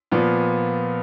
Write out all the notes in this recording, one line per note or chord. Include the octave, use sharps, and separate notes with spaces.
A#2 F3 B3